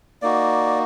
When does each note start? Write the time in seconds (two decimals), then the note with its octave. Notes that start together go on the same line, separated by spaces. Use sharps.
0.22 A#3 D#4 F#4 D5